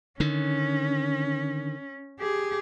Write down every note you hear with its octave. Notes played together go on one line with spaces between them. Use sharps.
D3 D#3 C#4
G4 G#4